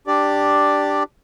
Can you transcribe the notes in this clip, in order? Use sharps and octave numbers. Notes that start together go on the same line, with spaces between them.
D4 G4 D5